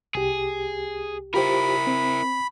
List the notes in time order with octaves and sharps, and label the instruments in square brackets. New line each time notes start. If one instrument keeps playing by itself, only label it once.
[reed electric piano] C2 G4 [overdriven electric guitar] G#4
[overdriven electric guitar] E4 A#4 [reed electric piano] F4 G4 C5 [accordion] B5
[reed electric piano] C4